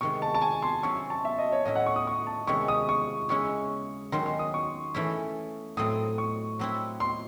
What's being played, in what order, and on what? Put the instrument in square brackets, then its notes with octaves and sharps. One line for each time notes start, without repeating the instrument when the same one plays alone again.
[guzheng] C3 D#3 G#3 [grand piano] C#6
[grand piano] A5
A5
G#5
C6
[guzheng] C3 F#3 C#4 E4 [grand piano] C#6
[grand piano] A5
E5
D#5
C#5
[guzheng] A2 F#3 C#4 E4 [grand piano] D#5
[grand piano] F#5
C#6
D#6
C#6
A5
[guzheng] C3 D#3 G#3 C#4 E4 [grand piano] C#6
[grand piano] D#6
C#6
[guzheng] C#3 G#3 C#4 E4 [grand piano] C#6
[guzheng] D#3 F#3 C#4 [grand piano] C6
[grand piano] C6
D#6
C#6
[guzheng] E3 A3 C#4 E4
[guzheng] A2 F#3 A3 C4 [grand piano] D#6
[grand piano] C#6
[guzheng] F#3 C4 E4
[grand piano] C6